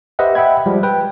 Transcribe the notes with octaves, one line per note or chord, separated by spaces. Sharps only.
G4 B4 C5 D#5 E5 F#5
E5 F#5 G5 B5 G#6
F3 G3 G#3
B4 G5